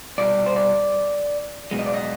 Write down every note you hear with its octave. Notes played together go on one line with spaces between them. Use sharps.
C2 B2 G3 D5
C5
D5
B1 B2 G#3
D#5
D5
D#5